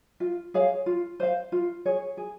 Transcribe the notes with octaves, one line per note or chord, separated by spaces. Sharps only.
F4
G#4 C#5 F5
F4
C5 F5
F4
G#4 C#5
G#4